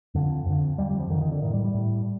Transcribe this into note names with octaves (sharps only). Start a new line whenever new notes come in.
F2 D3
F2 D3
F2 D3 G3
G3
F3
F2 D3 D#3
D#3
D3
A2 D#3
G3
G3
A2